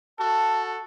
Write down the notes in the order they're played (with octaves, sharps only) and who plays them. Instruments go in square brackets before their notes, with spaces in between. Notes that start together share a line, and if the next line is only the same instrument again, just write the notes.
[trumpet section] F#4 A4 [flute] A5